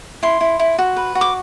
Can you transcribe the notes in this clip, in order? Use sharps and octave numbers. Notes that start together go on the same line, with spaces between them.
E4 C6
E4
E4
F#4
B4
F#4
D6